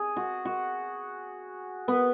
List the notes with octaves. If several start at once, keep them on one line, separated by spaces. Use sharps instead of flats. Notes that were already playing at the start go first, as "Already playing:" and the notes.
Already playing: G#4
F#4
F#4
B3